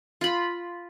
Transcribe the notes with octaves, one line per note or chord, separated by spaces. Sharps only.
F4 B5